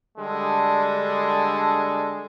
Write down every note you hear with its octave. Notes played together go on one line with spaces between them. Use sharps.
D3 G3 G#3 D4 A4